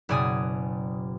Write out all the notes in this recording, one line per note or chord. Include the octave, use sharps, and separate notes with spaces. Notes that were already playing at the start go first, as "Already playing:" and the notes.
F#1 B2 D5 G#5 D#6